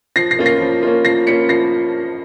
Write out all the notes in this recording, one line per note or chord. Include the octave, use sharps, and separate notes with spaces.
F3 A#6 C7
A#6 C7
A#3 C#4 F4
A#6 C7
F3
A#3 C#4 F4
F3 A#6 C7
A#3 C#4 F4 B6 C#7
F3 A#6 C7